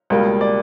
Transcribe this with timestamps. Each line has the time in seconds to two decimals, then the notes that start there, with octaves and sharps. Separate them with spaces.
0.10 C#2 B2 G3 A#3
0.41 D5